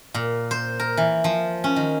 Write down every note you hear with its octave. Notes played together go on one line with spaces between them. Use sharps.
A#2
C5
A#4
E3
F3
C#4
D#3